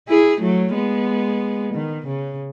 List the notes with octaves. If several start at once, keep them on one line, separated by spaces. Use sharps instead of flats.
E4 G#4
F#3 A3
G#3 B3
D#3
C#3